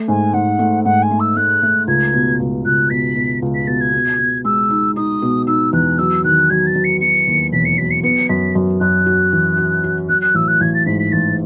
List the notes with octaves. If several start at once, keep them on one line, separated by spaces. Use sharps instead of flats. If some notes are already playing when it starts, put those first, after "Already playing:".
Already playing: A3
G#2 G#5
G#2 F#5
A3
G#2 F#5
G#5
A3
E6
A3 F#6
A3
C#2 G#6
B2
C#2
C#2 F#6
B2 B6
B2
C#2
B6
B2 A6
G#6
B2
B2
G#3 E6
D#4
D#4 D#6
B2
D#4 E6
E2 F#6
F#3 E6
D#3 F#6
F#3 G#6
A6
F#3
C#7
F#3 C#7
D#2
E1 B6
C#7
F#3 B6
C#7
B3 C#7
F#2 B6
F#2
F#2 F#6
F#4
E3
F#4
F#4
F#3 F#6
F#6
A1 E6
F#6
A1 G#6
A6
G#2 B6
B6
A1 A6